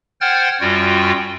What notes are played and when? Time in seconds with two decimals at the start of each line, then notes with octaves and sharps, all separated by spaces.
0.21 C5 F#5 G5 F6 G#6 A6
0.61 F#2 G3 F4 F#4 G5